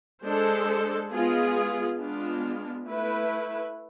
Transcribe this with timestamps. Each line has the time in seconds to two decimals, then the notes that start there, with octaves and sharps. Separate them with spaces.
0.24 G#3 D4 A4 C5
1.12 G#3 B3 F4 G#4
1.99 G#3 B3 D4 F4
2.87 A3 E4 B4